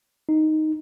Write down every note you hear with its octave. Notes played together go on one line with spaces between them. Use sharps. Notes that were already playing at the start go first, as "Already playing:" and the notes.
D#4